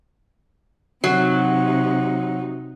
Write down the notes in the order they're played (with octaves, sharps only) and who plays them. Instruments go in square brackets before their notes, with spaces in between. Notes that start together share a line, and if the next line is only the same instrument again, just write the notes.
[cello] C3 D#4 [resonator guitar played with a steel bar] F#3